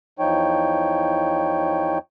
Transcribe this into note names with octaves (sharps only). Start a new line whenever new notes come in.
E2 F3 D#4 C#5 G5